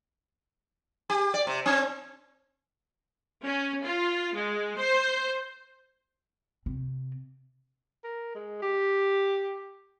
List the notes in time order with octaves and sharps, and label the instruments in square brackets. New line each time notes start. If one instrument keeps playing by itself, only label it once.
[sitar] G4
D5
C3
C4
[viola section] C#4
F4
G#3
C5
[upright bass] C3
[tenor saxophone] A#4
G#3
G4